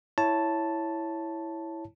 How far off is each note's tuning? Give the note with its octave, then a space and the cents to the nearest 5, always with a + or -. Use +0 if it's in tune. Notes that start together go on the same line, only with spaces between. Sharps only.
E4 +0 C#5 +0 A5 +0